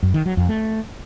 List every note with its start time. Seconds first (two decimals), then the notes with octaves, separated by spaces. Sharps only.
0.03 F#2
0.14 D#3
0.26 F#3
0.37 F2
0.49 A3